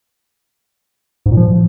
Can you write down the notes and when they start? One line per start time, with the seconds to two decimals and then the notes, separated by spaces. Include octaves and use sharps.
1.26 G#2
1.31 A#2
1.37 F3